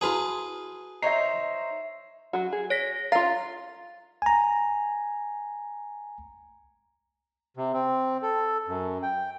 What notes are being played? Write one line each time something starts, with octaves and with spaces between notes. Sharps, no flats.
E4 F#4 G#4 B4 F5 A5
D#4 C5 C#5 E5 A#5 C7
F#3 F#4
G#4
C#5 A#6 B6
F4 F5 A#5 A6
G#5 A#5
C3
C4
A4
F#2
G5